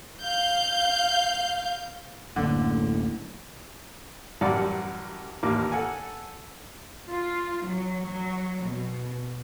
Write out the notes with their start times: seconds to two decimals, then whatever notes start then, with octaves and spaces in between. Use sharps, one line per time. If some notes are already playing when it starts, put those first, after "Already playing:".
0.22 F5 G6
2.36 D1 F#2 A2 D3 A#3
4.41 A1 F#2 G3 D5 F#5
5.43 A1 D#2 A#3 D6
5.72 A4 F#5 G#5
7.09 F4
7.65 F#3
8.05 F#3
8.64 B2